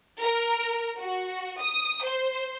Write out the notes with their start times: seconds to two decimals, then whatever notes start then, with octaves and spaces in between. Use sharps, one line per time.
0.21 A#4
0.99 F#4
1.60 D#6
2.05 C5